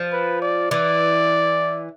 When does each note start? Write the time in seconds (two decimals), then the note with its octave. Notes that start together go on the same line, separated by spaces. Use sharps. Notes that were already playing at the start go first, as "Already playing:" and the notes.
Already playing: F3
0.12 B4
0.42 D5
0.71 E3 D5